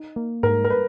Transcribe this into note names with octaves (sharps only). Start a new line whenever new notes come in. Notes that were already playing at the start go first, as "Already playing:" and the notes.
Already playing: D#4
A#3
G#2 A#4
A#4
B4